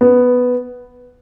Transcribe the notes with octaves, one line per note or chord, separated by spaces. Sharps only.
B3